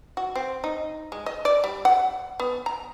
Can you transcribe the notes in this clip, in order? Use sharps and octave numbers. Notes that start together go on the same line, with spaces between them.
F#4
C4
D#4
G#3
D#5
D5
G3
F#5
B3
A#5